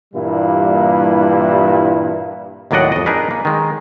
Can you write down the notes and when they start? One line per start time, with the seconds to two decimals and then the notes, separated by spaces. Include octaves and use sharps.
0.14 G2 A#2 E3 G3 A#3 E4
2.71 D#2 A2 F#3 D5 D#5 F#5
2.92 F2 D#5
3.06 D4 D#4 G#4 A#4 B4
3.31 A#3
3.45 D#3 G#3